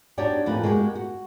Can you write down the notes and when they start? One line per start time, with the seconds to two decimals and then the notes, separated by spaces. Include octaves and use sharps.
0.18 D4 D#4 F#4 G4 C#5 D5
0.46 F2 A2 E3 A#3 B4
0.63 G#3 A#3 F#4 G4
0.95 F#4